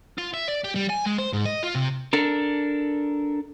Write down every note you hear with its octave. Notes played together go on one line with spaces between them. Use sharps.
F4
E5
D5
G4
G3
G#5
G#3
C5
G#2
D#5
F4
C3
D4 A4 A#4